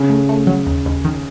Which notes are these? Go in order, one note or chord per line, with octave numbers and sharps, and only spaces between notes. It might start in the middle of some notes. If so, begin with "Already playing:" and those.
Already playing: C#3
A3
A3
F#3
D#2
D#2
D#3